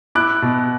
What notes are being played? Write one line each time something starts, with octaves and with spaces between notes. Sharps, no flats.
E4 D6 F#6
B2